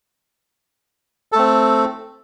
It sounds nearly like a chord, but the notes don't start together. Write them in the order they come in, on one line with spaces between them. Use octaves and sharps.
A4 A3 C4